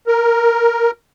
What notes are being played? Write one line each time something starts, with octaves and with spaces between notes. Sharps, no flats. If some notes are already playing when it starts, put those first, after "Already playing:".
A#4